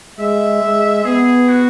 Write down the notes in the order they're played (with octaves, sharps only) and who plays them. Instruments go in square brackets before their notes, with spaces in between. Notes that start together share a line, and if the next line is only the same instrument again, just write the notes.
[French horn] G#3 [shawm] E5
[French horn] G#3
[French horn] B3 [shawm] G#4
[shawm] F#4